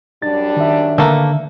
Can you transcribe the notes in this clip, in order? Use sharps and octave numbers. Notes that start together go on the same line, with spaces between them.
F#2 G3 D4 A6
D#3 E5
D3 A3 A#3 B4